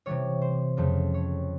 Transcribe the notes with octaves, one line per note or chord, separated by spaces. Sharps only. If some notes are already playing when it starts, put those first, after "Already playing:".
C3 E3 G3 C#5
C5
F2 C#3 F3 A3
C#5